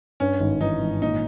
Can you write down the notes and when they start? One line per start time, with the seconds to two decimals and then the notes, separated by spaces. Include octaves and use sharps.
0.20 G2 C#4
0.40 G#1
0.61 E3 D#4
0.81 G#1
1.01 A#2 D#4